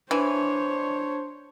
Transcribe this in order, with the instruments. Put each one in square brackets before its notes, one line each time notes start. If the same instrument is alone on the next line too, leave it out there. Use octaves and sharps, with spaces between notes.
[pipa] E3 [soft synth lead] D4 [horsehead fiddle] C5 C#5